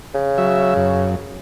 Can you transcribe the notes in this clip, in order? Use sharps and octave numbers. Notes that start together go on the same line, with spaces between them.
C#3
F#3 E5
F#2